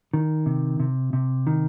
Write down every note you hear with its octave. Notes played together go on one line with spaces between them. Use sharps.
D#3
C3
C3
C3
D#3